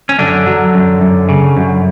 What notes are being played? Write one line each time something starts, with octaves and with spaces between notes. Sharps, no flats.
C#4
F#2 D3 D4
F#3
F#2
F#2
C#3
F#2